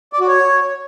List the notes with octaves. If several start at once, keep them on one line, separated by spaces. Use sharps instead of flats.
D5
F#4
C#5